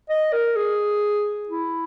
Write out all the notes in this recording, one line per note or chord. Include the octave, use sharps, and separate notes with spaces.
D#5
A#4
G#4
E4